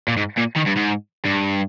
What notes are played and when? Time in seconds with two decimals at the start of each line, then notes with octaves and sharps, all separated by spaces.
0.08 A#2
0.17 G#2
0.37 A#2
0.56 D#3
0.66 G2
0.76 G#2
1.25 G2